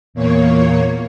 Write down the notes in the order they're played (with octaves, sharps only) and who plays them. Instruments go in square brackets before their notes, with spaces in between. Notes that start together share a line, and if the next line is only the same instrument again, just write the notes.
[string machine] E2 A#2 A#3 C#5